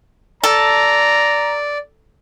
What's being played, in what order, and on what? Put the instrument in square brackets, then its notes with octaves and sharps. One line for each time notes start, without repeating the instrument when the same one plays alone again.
[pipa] A4 [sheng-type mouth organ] D5 [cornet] A#5